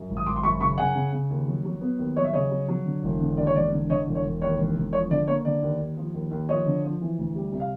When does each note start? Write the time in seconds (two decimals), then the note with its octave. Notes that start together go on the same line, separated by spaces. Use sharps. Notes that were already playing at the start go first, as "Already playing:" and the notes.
Already playing: F#2
0.09 G#1
0.17 D#6
0.26 G#1 C6 D6
0.36 C6
0.43 F#2 B5 C#6
0.60 C#3 B5 C#6
0.78 C#3 F#5 G#5
0.95 C#3
1.12 C#3
1.30 D#2
1.47 F#3
1.65 F#3
1.81 B3
1.98 D#2
2.16 F#3 C#5 D#5
2.24 E5
2.33 C#3 C#5 D#5
2.51 F#3
2.69 F#3
2.86 D3
3.03 E1
3.20 D3
3.37 D#2 D5
3.47 C#5
3.55 E1 D5
3.72 D3
3.90 D3 C#5 D#5
4.07 E1
4.15 C#5
4.24 E1
4.41 D#2 C#5
4.58 E1
4.76 E1
4.93 F3 C#5
5.10 D3 D5
5.28 A#3 C#5
5.45 D3 D5
5.62 D#2
5.80 D#2
5.97 F3
6.14 D#2
6.31 D#2
6.49 F3 C#5 D#5
6.66 D3
6.84 F3
7.01 E3
7.18 D2
7.35 G3
7.52 C3
7.60 F5